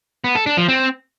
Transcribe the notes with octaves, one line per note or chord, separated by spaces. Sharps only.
B3
A4
D4
F3
C4